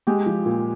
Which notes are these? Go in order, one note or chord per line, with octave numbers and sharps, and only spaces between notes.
G#3 G4
F3
A#2